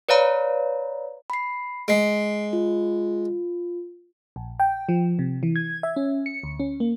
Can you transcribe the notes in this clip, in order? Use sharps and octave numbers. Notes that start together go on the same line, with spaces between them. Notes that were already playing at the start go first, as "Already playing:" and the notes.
B4 C#5 D5 F5 A#5 B5
B5 C7
G#3 C7 D7
F4
A#1
G5
F3
C3
E3
G#6
E5
C#4
C#7
D2
C#4
A#3